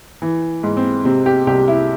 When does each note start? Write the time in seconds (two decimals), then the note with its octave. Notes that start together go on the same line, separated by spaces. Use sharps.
0.22 E3
0.63 G#2
0.77 C4
1.05 C3 C4
1.26 G4
1.47 C2 G4
1.68 E4